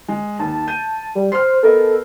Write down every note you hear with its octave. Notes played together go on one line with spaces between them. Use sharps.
G#3
D#2 A5
G6 D#7
G3
C5 F6 C7
B3 A4 A#4 D#5